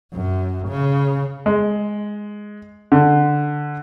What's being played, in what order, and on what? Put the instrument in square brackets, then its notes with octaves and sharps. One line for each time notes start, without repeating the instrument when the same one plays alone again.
[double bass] F#2
C#3
[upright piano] G#3
D3